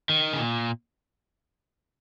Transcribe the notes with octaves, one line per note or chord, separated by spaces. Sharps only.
D#3
C#3
A#2